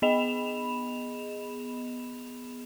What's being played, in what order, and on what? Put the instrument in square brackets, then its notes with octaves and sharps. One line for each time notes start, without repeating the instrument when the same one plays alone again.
[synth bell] B3 G#4 D#5 B5 E7 F7